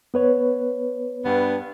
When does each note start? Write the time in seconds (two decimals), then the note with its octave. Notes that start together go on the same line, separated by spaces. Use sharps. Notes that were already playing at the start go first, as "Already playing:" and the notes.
0.14 B3 B4 C#5
1.25 G2 B3 D4